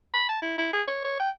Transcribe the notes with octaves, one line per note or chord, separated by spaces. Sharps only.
B5
A5
E4
E4
G#4
C#5
C#5
G5